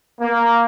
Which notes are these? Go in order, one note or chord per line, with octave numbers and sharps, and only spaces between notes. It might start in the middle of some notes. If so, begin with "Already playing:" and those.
A#3